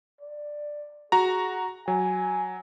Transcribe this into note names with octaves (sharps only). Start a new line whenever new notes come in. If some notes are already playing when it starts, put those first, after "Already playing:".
D5
F#4 G#4 A#5
F#3 G#5